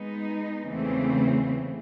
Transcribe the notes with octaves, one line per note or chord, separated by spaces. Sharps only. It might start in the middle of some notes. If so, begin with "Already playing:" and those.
Already playing: G#3 B3 D#4
E2 C#3 E3 A3 C4